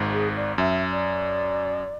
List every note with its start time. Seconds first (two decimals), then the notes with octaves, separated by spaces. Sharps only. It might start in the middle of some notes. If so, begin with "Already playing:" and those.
Already playing: G#1 G#2
0.12 G#4
0.36 D5
0.58 F#2 E5
0.92 D5